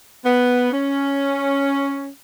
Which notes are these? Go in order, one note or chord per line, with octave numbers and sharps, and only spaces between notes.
B3
C#4